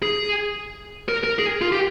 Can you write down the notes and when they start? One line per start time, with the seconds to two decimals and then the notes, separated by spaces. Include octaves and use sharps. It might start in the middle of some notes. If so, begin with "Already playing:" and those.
0.03 G#4
1.08 A#4
1.24 A#4
1.39 G#4
1.62 F4
1.72 G4